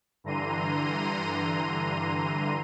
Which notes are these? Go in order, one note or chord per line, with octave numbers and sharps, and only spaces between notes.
G2 D3 E3 A#5 C6 D#7